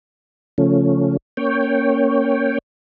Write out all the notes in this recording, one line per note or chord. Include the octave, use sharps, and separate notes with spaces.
C#3 F3 A3 C#4
A#3 C#4 C#5 G5